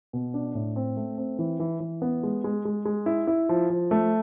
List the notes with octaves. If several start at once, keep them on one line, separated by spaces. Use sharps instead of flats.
B2
D4
A2
C4
A3
C4
E3
E3
E3
B3
G#3
G#3
G#3
G#3
E4
E4
F3
F3
A3